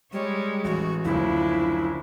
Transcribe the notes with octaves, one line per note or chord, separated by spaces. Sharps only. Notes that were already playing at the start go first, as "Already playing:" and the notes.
G3 G#3 C#5
A1 F#4
F#1 D2 F3 D4 E4